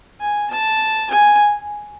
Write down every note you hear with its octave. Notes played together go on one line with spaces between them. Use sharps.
G#5
A5
G#5